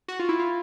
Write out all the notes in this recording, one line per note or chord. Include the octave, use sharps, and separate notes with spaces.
F#4
F4
E4
F4